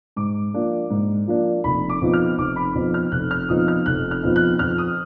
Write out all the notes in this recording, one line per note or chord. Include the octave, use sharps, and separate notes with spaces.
G#2 D6
F3 A#3 D4
G#2
F3 A#3 D4
F1 B5
D6
F2 F3 B3 D#4
F6
F1 D6
B5
F2 F3 B3 D#4
F6
F1 F#6
F6
F2 F3 B3 D#4 D#6
F6
F1 F#6
F6
F2 F3 B3 D#4
F#6
F2 F6
D#6